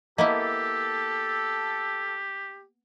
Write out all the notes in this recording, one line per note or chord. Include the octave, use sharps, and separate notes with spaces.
A#3 B3 E4 G4 A4 D#5